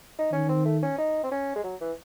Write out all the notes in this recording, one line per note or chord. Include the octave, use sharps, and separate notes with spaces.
D#4
D#3 C#4
C4
A3
C#4
D#4
C4
C#4
G#3
F#3
E3